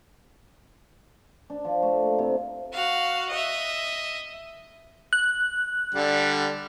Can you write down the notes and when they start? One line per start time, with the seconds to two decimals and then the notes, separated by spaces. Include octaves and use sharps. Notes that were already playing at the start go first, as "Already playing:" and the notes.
1.50 D4
1.65 F3
1.83 A3
2.03 A#3
2.19 C3
2.73 F#4 F5
3.29 D#5 E5
5.13 F#6
5.95 D3 G3